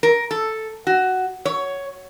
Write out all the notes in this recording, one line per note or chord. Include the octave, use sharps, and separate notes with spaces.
A#4
A4
F#4
C#5